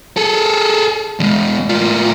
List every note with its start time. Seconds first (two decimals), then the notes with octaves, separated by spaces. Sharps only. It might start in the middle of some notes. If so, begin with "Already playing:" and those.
0.17 G#4 A4
1.20 E2 G#3
1.69 A2 F4